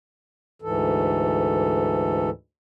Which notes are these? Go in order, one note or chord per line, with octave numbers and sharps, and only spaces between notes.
D2 G#2 E3 A4